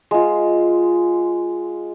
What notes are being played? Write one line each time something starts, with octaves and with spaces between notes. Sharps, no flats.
G#3 F4